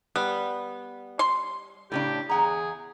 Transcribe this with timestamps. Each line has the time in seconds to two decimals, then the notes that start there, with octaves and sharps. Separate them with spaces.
0.16 G3 B3
1.19 C6
1.92 A2 C#3 D4 G4
2.29 E2 G#4 F#5 A#5